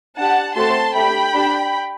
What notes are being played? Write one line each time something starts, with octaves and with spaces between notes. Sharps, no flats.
D4 G4 F#5 A5
A3 C4 F#4 A4 A5 C6
A3 D4 G4 G5 B5
D4 G4